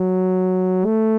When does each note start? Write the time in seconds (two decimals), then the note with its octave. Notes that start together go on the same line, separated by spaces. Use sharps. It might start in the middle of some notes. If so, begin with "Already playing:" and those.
Already playing: F#3
0.86 A3